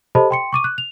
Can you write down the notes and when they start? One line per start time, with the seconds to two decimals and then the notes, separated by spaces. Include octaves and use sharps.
0.15 G4 A4 C5 D#5 A5 B5
0.30 G5 C6 C#7
0.53 C#6 D6 D#7
0.64 F#6
0.78 F7